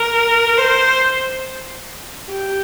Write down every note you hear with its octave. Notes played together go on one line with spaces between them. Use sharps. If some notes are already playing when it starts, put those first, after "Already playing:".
Already playing: A#4
C5
G4